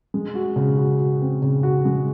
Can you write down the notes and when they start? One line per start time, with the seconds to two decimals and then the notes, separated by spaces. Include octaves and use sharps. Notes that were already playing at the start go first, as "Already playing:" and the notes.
0.14 G#3
0.35 F#4
0.56 C#3
0.77 F#4
1.00 F#4
1.21 C4
1.42 C#3
1.63 F#4
1.85 G#3